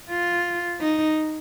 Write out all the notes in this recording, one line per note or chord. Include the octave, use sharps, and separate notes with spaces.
F4
D#4